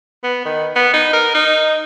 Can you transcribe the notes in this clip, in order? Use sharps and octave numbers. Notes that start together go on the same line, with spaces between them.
B3
D#3
B3
D#4
A#4
D#4